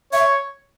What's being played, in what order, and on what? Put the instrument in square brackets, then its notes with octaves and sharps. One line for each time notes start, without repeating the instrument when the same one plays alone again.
[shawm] C#5 [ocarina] E5